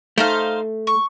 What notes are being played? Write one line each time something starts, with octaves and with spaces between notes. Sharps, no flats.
A3 D#4 C5 F5
C#6